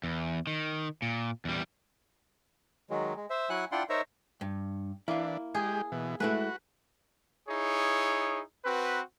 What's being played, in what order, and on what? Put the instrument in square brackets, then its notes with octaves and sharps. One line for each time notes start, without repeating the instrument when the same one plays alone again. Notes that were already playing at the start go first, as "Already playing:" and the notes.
[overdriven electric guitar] E2
D#3
A#2
E2 G3
[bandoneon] D#3 F#3 G#3
G#3
C5 E5
F#3 E4 F#5 G#5 F#6
D4 E4 F4 F#5 G5 C6
D#4 A#4 C5 C#5 E5 A#5
[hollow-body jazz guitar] G2
[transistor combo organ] E3 D4 [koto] A#3 [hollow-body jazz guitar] E4 F5
[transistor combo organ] G#3 G4 [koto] G#4
[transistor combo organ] B2 E3
[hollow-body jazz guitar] G#3 A3 E4 [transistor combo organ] F#4 [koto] B4
[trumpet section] D#4 E4 G#4 C#5
C4 F#4 B4